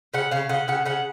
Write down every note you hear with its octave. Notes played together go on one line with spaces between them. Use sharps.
C#3 F#5
C#3 F5
C#3 F#5
C#3 F#5
C#3 F#5